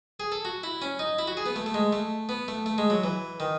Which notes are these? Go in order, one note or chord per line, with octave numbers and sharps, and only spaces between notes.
G#4
A4
F#4
E4
C#4
D#4
E4
F#4
G#4
B3
A3
A3
G#3
A3
B3
A3
A3
G#3
F#3
E3
D#3